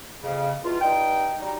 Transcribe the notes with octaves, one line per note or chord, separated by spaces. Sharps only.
F2 C#3
E2 B2 F4
G2 D#4 G5
F#3 G3 D#4